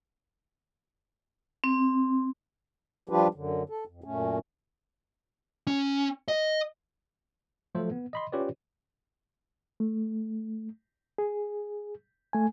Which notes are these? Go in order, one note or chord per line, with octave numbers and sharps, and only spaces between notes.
C4
F3 G3 D4 F4 G4 B4
F#2 D3
A4
F2
F#2 A#2 A3 C#4
C#4
D#5
F3 F#3 A3 F4 A4 C5
B3
D#5 B5 C6
C#4 F4 G4 B4 C#5 D5
A3
G#4
A3 G#5